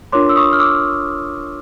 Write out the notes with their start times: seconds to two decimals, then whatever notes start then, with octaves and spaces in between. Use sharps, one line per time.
0.12 D4 F4 A#4 C#5 C6 D6
0.29 E6
0.36 C#6 D#6
0.53 F6
0.60 D6 E6